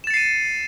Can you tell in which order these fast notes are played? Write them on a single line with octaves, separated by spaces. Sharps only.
E7 A6 C#7 C7 D#7